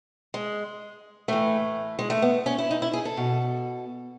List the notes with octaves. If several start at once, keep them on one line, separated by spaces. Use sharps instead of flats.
G#3
A2 E3 A3
G#3
A3
B3
C#4
E4
D#4
E4
G#4
A4
B2